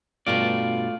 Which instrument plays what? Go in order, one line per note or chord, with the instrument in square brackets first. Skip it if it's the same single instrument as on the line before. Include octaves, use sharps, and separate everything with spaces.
[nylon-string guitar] G2 B2 [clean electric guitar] A3 F4 D5